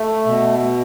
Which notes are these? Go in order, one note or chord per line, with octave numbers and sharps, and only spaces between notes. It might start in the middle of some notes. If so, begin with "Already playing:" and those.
Already playing: A3
B2